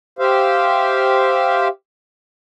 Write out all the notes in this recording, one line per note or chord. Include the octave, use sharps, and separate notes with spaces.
G4 C5 E5 F5